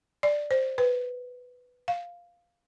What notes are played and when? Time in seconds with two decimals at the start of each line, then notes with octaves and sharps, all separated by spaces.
0.23 D5
0.51 C5
0.78 B4
1.88 F5